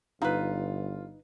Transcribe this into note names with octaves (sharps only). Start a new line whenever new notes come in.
G1 D#4 F4 B4